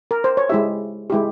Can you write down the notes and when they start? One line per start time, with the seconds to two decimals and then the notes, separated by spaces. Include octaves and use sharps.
0.11 A#4
0.24 C5
0.37 C#5
0.49 G#3 E4 G4 E5
1.10 G#3 E4 G4